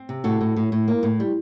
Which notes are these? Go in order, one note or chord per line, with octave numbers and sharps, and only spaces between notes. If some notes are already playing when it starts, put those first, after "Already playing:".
Already playing: C4
C3
A2 F#4 A4
A2
A2
A2
A#3
A2
G3